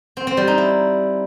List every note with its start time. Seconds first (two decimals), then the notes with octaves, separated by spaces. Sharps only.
0.17 C4
0.27 C4
0.37 G3
0.47 D#4
0.58 E4